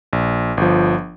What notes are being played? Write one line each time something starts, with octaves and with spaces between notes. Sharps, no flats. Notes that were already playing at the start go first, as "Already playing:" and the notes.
A#1
G1 F3